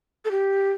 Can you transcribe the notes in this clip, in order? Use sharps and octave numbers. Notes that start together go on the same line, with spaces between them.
A4
G4